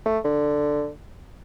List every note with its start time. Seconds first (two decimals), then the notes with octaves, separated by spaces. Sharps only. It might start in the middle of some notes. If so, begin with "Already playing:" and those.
0.06 A3
0.25 D3